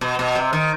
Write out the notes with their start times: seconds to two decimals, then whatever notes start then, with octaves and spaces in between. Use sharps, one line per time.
0.01 B2
0.19 B2
0.36 C3
0.53 D#3